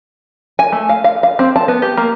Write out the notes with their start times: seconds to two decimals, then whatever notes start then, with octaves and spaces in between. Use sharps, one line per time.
0.59 G#5
0.72 A3
0.89 F5
1.04 F5
1.23 F5
1.39 C4
1.56 A5
1.68 B3
1.82 G4
1.97 A#3